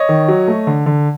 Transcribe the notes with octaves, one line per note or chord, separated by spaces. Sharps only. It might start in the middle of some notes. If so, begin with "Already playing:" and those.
Already playing: C#5 D#5
D#3
F#3
A3
D3
D3